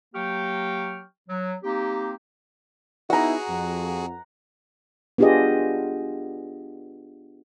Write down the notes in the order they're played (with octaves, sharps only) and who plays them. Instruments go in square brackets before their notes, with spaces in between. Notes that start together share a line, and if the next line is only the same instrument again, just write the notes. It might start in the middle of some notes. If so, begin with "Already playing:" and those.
[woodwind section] F#3 A#3 G4 G5 C#6 F6
F#3
A#3 C4 D#4 G4
[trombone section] B3 D#4 E4 [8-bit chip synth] F#4 G#4 [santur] F#5 A#5
[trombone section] F2
[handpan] B3 D4 F4 G4 G#4 D#5